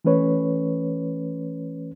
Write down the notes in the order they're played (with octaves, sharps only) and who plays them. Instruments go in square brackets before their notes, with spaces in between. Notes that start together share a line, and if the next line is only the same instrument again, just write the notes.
[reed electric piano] E3 A3 C#4 B4 C#5